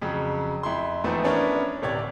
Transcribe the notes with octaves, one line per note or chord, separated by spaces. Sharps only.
F2 C#3 F#3
F2 E4 C6
E2 G#2 F3 A3 B3 C4
B3 C#4 D4 E4 A#4 C#5
D1 C3 C#5 D5 G#6